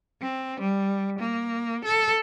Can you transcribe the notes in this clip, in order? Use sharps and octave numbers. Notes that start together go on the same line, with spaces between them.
C4
G3
A#3
A4